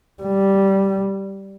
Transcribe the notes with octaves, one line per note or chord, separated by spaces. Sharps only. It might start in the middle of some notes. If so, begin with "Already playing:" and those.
G3